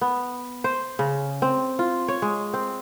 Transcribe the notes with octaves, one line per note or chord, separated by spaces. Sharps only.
B3
C5
C#3
C4
F4
C#5
G#3
C4